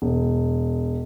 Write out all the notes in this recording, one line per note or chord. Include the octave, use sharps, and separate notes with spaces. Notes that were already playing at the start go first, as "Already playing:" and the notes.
E1